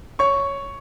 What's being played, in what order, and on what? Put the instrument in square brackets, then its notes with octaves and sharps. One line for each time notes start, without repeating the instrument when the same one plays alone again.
[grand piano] C#5 C#6